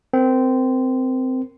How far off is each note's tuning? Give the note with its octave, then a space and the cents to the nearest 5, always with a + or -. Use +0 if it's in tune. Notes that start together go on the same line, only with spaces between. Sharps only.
C4 -15 A#4 +0